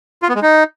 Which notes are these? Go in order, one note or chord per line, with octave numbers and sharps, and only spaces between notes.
F4
B3
G#3
D#4